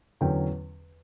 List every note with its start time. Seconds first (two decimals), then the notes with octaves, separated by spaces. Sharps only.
0.21 E2 D3 F#3 C#4 G5